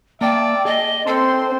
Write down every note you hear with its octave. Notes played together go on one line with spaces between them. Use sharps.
A#3 D5 E5 G5 A5
G#4 D#5
C4 A4 C5 A5 C6